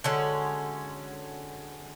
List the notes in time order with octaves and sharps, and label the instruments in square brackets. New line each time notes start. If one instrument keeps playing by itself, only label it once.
[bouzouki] D3 G#3 C#4 F#4